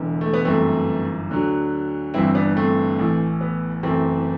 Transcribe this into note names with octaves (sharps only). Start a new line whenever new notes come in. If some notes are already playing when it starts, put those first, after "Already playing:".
Already playing: E1 E2 D3
A3
B3
G1 F#2 E3 A3 C4
D2 D3 F#3
G1 G2 E3 C4 E4
B3 D4
A3 C4
A1 A2 E3
B3
F#1 F#2 E3 A3 C4